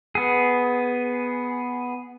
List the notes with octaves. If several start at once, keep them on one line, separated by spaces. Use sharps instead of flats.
B3 G#4